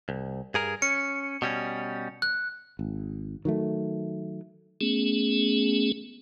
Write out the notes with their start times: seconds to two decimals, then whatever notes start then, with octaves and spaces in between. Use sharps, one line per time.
0.09 C2
0.54 G2 G#4 A#4
0.82 C#4 C#7
1.42 B2 G3 C#4
2.22 F#6
2.79 G#1
3.45 D#3 F#3 A3
4.81 A3 B3 C#4 G#4